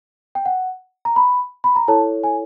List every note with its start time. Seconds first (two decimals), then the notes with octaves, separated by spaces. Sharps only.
0.35 G5
0.46 F#5
1.05 A#5
1.16 B5
1.64 B5
1.76 A#5
1.88 E4 A4 C#5 A5
2.24 G#5